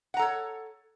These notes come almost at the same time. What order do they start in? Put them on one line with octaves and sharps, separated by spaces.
F#5 A#5 A4 C#5